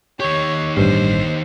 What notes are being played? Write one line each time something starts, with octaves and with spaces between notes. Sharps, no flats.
D#3 G4 C#5
A1 G2 C5